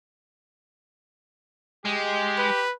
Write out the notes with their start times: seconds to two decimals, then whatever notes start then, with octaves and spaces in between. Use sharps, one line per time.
1.86 G#3 G4
2.38 B4